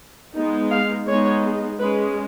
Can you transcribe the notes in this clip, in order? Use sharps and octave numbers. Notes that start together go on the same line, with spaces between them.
G#3 B3 D#4
F5
G#3 B3 D#4 C#5
G#3 C#4 B4